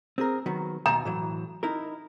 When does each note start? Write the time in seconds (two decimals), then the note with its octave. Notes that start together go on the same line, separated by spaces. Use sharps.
0.18 C4 G#4 A#4
0.46 D#3 F#3 B3
0.86 D#2 B2 A#5
1.05 A2 E3 F#3
1.63 D#4 E4 A#4